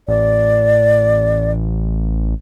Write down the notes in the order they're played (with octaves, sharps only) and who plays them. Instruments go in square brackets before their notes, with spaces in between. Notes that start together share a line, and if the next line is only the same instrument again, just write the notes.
[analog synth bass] A1 [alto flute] D5